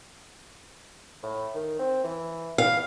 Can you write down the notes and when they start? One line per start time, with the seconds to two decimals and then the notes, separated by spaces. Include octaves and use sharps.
1.23 A2
1.54 D#3
1.79 C4
2.04 E3
2.58 E3 F5